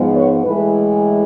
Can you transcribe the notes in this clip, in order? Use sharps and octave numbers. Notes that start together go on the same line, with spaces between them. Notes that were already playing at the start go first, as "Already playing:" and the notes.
Already playing: G#2 F3 G#3 B3
B4 C#5
A2 E3 G#3 A4 B4